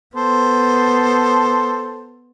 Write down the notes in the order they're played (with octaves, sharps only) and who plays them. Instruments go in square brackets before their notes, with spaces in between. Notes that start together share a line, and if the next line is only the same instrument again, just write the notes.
[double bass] B3 [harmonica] A4 C5